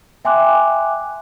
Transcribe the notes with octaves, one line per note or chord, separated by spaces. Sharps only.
E5 G5 G#5 C6 D6 F#6